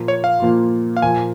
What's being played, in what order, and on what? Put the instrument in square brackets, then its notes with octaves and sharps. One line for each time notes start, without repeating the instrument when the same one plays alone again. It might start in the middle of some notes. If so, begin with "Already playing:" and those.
Already playing: [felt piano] A#2 F3 A#3 F4
[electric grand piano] C#5
F5
[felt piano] A#2 F3 A#3 F4
[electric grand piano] F5
[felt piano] A#2 F3 A#3 [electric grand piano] G#5